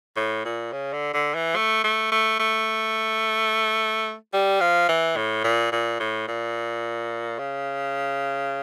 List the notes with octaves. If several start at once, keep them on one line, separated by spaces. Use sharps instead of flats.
A2
A#2
C#3
D3
D3
E3
A3
A3
A3
A3
G3
F3
E3
A2
A#2
A#2
A2
A#2
C#3